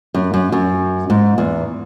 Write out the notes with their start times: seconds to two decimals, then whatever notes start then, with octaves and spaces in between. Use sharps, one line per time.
0.14 F#2
0.34 F#2
0.52 F#2
1.10 G#2
1.38 E2